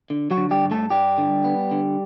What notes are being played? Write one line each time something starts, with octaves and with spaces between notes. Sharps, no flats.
D3
F#3 F#4
D3
G3 G4
G2
A3 A4
G2 G3 G4
D3
B3
D3